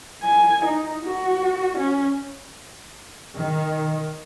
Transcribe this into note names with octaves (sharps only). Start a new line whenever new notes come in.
G#5
D#4
F#4
C#4
D#3